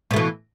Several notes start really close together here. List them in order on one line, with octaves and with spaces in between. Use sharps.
B2 A3 E3